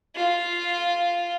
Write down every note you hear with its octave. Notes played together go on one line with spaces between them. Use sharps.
F4